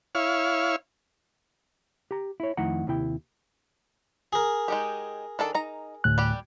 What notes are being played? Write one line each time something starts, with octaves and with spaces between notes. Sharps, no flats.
E4 C#5 F5
G4 A#5
E4 C#5
F2 D#3 A3 E4 F#5 A#5
D#2 C3 E4 G5
G#4 A#4
G#3 D#4 G4
D#3 D4 A4
D#4 A#5
D2 A2 F#6
G3 G4